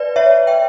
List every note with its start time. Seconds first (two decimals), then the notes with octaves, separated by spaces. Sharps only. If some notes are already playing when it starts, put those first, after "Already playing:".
Already playing: B4 D5
0.16 C#5 E5
0.47 E5 G5